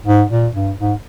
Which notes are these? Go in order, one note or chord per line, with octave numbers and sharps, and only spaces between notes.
G#2
A#2
G2
G#2